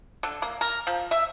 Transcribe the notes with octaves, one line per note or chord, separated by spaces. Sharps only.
D3
A#3
A#4
F3
E5